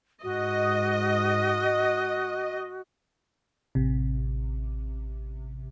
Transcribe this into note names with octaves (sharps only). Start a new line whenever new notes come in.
G#2 F#4 D#5
A1 C3